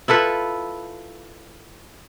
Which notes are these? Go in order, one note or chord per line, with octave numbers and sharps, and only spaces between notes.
E4 F4 A4 B4